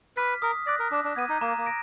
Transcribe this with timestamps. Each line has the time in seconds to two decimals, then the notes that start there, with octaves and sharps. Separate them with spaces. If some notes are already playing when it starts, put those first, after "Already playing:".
0.17 B4 D6 F6 B6
0.42 A#4 D#6
0.67 D5 F#6 A#6
0.79 A#4
0.91 D4 D6
1.05 D4
1.16 B3 G#6 D#7
1.29 D#4
1.41 A#3 A#5
1.58 A#3
1.66 A#6 D7